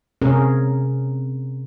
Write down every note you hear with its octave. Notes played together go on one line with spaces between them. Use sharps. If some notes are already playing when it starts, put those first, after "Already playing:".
C3 C#4 G#4 A#4